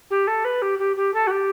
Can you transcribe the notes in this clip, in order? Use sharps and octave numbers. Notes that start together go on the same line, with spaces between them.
G4
A4
B4
G4
G4
G4
A4
F#4
G4